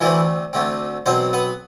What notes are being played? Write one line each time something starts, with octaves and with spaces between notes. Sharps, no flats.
D2 D3 E3 A3 C4 E4
D2 D3 A3 C4
B1 B2 F#3 C4 C5
B3 B4